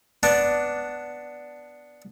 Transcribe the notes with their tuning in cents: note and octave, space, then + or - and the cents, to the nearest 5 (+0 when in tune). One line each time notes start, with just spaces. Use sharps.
B3 +0 D4 +0